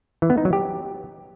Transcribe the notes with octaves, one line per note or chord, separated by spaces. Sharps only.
E3
B3
D#4
F#3
G4